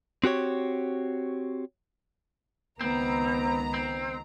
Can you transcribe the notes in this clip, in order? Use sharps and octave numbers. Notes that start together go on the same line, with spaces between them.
C4 F#4 G4 C#5
C#2 D#3 B3 C4 A#5
C4